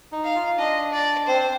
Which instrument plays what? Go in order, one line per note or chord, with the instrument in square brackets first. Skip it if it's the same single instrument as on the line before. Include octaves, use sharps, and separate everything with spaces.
[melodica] D#4
[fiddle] F5
[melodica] F4
[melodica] D4 [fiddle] D#5
[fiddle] D5
[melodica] C4 [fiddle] C5